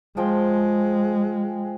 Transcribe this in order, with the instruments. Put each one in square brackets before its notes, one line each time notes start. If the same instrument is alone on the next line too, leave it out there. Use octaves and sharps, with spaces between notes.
[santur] F3 G#4 G5 [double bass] G#3